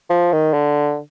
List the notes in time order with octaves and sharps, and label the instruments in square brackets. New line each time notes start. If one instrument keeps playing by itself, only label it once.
[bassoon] F3
D#3
D3